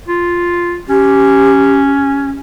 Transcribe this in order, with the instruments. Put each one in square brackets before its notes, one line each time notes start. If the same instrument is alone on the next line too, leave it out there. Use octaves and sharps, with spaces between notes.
[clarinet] F4
[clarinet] C#4 [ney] G4